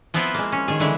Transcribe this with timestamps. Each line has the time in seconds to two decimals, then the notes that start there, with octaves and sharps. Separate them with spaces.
0.14 F3 B3 C4 E4 F4 B4
0.34 G#3 A#3
0.52 C#4
0.68 D#3 G#4
0.80 D3 E3 G#3 E4 G#4